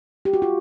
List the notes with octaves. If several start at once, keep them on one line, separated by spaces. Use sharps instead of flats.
G4
F#4
F4